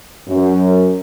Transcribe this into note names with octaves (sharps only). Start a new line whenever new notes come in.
F#2